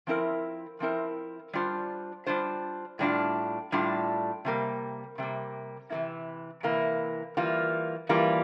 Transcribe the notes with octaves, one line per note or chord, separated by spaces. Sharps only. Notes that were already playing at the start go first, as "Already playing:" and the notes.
F3 C4 E4 A#4
F3 C4 E4 A#4
G3 D4 F4 C5
G3 D4 F4 C5
A2 G3 D4 F4
A2 G3 D4 F4
C3 G3 A#3
C3 G3 A#3
C3 E3 A#3 E4
C3 E3 A#3 E4
E3 G3 A#3 F4
E3 G3 A#3 F4